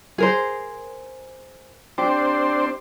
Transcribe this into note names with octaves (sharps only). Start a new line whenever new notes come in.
G#4 A#4 C5
C4 D4 G4 C5